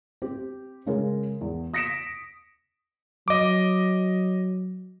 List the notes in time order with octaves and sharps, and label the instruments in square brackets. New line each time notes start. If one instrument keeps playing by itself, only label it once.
[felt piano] C4 G4
C#3 G#3 C#4 A#4
E2
D#6 A#6 B6 C#7 D7 E7
[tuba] F#3 [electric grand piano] D#5 D6